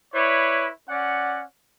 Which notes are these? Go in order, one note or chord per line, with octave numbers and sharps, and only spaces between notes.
E4 B4 C#5 D5
C#4 D5 F#5